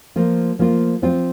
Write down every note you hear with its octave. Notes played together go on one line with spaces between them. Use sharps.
F3 A#3 F4
F3 A#3 F4
F3 C4 F4